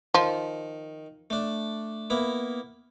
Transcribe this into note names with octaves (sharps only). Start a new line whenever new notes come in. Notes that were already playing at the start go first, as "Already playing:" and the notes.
D#3 F3
A3 D4
A#3 B3 E4